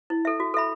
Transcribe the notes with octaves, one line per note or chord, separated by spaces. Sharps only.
E4
A4 E5
F#4
A4 E5 B5